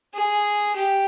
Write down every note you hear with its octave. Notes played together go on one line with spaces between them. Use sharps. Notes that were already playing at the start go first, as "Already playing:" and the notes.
G#4
G4